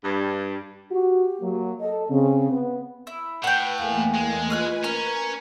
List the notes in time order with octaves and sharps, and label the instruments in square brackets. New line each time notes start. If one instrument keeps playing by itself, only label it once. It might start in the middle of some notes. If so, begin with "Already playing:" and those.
[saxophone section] G2
[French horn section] F#4 [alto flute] G4
[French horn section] F#3 A#3
[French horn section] A4 [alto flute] D#5
[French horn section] C#3 [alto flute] C4
[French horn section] B3
[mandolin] E4
[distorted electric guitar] A2 [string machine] B4 [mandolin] F#5 G5
[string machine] E2 A3 A#3 [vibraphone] F5 G#5
[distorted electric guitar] G#3
[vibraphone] F4 D#5 [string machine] B4 G#5 [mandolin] C#5 F6 F#6
[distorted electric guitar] C#4 [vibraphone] A#4 [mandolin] A#5